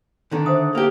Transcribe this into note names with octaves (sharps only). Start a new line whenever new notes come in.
D3 D#3
C5 E5 D#6
A#3 G4